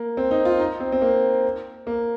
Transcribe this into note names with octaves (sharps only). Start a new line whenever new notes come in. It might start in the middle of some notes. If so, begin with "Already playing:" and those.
Already playing: A#3
C4
D#4
F4
D#4
C4
C4
A#3
A#3